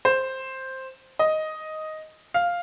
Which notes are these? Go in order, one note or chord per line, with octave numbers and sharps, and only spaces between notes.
C5
D#5
F5